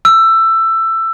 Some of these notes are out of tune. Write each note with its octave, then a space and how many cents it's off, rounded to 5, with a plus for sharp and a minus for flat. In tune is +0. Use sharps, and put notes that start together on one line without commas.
E6 +15